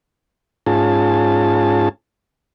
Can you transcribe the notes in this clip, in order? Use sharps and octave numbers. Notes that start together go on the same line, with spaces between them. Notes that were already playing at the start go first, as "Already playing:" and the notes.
G#2 C#4 F4 G#4 A5